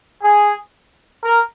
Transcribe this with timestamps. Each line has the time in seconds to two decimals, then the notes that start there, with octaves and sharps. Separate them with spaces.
0.22 G#4
1.23 A#4